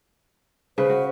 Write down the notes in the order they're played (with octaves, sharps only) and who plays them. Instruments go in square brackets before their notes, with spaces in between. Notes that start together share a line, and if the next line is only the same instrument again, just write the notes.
[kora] C#3 B4 [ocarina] C5
[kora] F#4